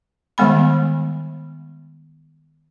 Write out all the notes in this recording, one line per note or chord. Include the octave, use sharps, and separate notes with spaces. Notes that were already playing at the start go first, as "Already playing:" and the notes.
D#3 G3 G#3 B3 B5